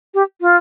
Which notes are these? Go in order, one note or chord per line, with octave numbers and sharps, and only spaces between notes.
G4
F4